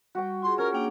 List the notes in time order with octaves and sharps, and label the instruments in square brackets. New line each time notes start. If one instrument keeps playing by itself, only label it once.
[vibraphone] G3 C#6 [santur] F#4 G5
[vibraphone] F4 G#4 [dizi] C6
[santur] C#4 [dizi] A#4
[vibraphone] A#3 D4 G#4 [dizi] G5